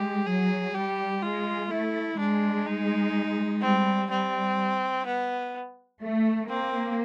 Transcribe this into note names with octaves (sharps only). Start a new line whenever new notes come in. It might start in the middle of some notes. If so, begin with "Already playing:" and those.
Already playing: G#3 G4
F#3 G#4
G3 G4
G#3 F4
A3 E4
G#3 D4
D#4
G3 C4
G3 C4
B3
A3
A#3 C4